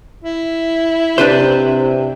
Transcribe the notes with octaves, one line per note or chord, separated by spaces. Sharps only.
E4
C3 D4 B4 C5